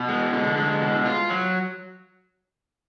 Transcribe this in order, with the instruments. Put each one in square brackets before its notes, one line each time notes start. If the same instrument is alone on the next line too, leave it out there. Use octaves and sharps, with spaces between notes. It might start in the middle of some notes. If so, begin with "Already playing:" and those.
Already playing: [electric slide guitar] B2
G#3
D3
G#3
B2
F4
F#3